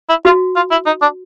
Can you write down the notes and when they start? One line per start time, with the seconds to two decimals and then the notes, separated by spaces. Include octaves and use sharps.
0.09 E4
0.25 F4 F#4
0.56 F4
0.71 E4
0.86 D#4
1.02 D4